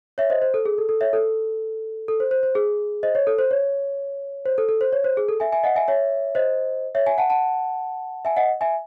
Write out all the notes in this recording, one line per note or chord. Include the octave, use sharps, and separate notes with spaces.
C#5 E5
C5 D#5
C5
A4
G#4
A4
A4
C#5 E5
A4
A4
C5
C5
C5
G#4
C5 D#5
C#5
A4
C5
C#5
C5
A4
A4
C5
C#5
C5
G#4
A4
E5 G#5
E5 G#5
D#5 F#5
E5 G#5
C#5 E5
C5 D#5
C#5 E5
E5 G#5
F#5 A5
F#5 A5
E5 G#5
D#5 F#5
E5 G#5